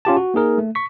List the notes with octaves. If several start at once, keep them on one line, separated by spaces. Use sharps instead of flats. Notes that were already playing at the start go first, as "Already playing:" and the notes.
C#4 F4 G4 A5
F#4
A#3 D#4 G#4 A#4
A3
C#6 B6